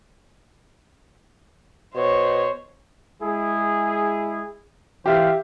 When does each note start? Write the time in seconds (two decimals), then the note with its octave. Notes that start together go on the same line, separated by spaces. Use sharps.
1.95 B2 C5 C#5
3.23 G#3 E4 G#4
5.06 E3 G4 C5 E5 F5